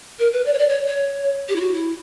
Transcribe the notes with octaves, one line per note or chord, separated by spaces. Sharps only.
A#4
B4
D5
C#5
D5
C#5
C#5
G4
E4
F#4
E4